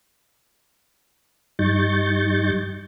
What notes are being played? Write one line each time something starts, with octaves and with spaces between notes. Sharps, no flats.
G2 G3 D#4 C#6 G6 A6